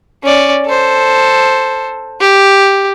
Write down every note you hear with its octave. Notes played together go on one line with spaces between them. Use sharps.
C#4 D5
A4 C5
G4